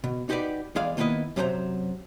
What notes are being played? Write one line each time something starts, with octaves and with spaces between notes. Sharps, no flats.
B2
D#4 F#4 G4 A#4 B4 D5
E2 G#3 G#4 D5 F5
D#3 A#3 B3 E4 B4 D#5
F#2 C3 F#3 A4 C5 A#5